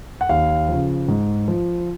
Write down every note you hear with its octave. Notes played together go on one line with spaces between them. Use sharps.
F#5
D#2 F5
F3
C#3
G#2
F3